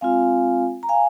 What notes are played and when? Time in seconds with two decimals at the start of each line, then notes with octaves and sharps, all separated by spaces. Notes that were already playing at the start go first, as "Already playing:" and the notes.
0.01 G#3 C4 F4 F5 G#5
0.83 A#5
0.89 F5 G#5